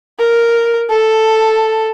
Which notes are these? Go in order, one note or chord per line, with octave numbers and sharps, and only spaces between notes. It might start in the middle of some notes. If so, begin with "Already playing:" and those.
A#4
A4